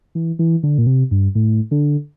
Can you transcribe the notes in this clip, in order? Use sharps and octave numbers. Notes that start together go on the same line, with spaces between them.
E3
E3
D3
A#2
C3
G2
A2
D3